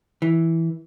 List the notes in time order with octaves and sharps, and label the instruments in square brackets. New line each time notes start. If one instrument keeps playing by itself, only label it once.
[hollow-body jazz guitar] E3